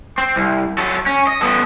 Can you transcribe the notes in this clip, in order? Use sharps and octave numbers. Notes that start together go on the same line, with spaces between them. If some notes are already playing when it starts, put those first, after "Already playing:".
C4
C2
F#3 A4
C#4
D#5
B3 A4